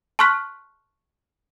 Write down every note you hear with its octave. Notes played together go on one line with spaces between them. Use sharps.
A5 C6 C#6 F6 F#6 B6